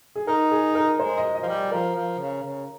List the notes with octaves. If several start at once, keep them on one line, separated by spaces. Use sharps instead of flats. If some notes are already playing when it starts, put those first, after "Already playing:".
G#4
D#4 A#4
G#4
A#4
G#3 C5
D#5
D#5
F3
G3
F3 A#4
F3
C#3
C#3